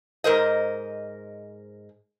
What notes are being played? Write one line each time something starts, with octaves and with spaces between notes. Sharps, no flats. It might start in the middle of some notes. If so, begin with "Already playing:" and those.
G#2 A#4 C5 D#5